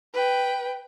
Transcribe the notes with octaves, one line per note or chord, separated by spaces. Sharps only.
B4 G5